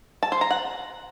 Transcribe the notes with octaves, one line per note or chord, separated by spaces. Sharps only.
A5
C5
A#5
F#5